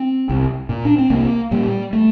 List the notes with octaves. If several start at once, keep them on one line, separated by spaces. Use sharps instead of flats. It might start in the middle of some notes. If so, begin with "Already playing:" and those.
Already playing: C4
C2
A#2
D4
C4
C2 A#3
A#2 G3
A3